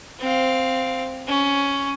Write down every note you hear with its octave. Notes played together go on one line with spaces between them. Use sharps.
C4 F5
C#4